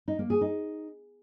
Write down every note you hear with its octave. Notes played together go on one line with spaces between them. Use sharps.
D#4
A#3
G#4
D#4